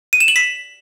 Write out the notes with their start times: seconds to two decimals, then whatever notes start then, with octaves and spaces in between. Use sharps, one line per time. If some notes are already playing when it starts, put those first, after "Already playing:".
0.13 D#7
0.20 E7
0.28 F#7
0.36 B6